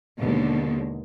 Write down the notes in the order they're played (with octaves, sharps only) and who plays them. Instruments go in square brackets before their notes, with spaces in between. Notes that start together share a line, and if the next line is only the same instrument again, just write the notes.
[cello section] D#2 B2 D3 G#3